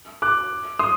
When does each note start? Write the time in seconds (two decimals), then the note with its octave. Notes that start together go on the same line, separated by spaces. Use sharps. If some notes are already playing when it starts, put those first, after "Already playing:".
0.22 D6 F#6
0.79 C6 D#6